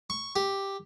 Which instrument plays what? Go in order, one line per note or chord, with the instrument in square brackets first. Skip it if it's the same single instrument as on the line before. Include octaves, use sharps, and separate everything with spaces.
[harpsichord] C#6
G4